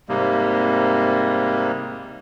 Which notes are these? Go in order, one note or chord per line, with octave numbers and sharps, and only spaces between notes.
G#2 C3 G3 A#3